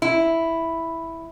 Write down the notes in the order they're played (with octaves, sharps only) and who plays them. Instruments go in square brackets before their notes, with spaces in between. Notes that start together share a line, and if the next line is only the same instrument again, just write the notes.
[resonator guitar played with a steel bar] E4